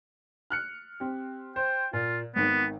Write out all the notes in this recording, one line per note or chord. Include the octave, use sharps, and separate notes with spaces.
F6 F#6 C#7
C4 G4
C5 G5
A#2 F4
G#1 D#3 B3